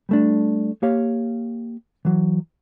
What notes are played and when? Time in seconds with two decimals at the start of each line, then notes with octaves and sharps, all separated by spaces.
0.09 G3 A3 D4
0.83 A#3 G4 C#5 F5
2.05 E3 F#3